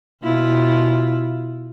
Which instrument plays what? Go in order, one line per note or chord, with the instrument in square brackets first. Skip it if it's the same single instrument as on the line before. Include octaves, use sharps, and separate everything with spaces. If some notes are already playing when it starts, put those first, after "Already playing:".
[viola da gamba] B2 E4 F4